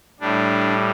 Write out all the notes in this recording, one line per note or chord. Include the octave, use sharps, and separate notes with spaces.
A2 G3 D4